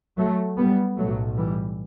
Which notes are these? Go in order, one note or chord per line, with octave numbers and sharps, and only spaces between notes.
F#3 A3
G3 B3
B1 A2 F#3 A3
E3 G3